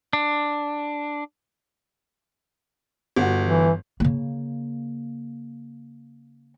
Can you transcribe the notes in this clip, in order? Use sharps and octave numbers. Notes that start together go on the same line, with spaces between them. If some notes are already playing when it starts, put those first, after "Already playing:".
D4
G1 F#4
E3
C#3 A#3